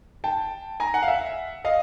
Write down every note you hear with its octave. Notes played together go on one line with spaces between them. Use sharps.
G5 A5
G#5 A#5
F#5 G#5
F5
E5 F#5
D#5 F5